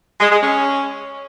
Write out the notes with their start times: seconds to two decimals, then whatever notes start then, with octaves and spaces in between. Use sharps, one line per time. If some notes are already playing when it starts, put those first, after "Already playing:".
0.20 G#3
0.31 G#3
0.42 C#4